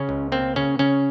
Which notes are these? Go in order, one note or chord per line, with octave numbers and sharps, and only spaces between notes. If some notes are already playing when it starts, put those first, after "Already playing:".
Already playing: C#3 C#4
C#2
A#3 C4
C#3 C#4
C#3 C#4